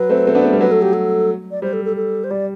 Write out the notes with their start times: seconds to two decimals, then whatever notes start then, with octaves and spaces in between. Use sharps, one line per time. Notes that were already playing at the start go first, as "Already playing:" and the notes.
Already playing: F#3 B4
0.09 A3 C4
0.27 A3 C4
0.35 B3 D4
0.44 A3 C4
0.53 G3 B3
0.61 F#3 A3 B4
0.72 A4
0.82 G4
0.93 A4
1.51 D5
1.62 G3 C5
1.73 A4
1.85 A4
1.96 A4
2.24 C5
2.30 G3 D5